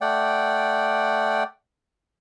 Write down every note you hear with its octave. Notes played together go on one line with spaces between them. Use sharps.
A3 D5 F#5 G5